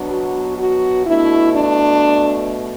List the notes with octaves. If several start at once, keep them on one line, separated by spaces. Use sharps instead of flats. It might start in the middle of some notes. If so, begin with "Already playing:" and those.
Already playing: B2 F#3 B3 D4
F#4
F#4
B2 A3 D4 E4
D4